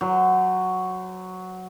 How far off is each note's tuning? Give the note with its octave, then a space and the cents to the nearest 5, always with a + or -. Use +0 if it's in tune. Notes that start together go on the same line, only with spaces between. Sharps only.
F#3 +0 C5 -35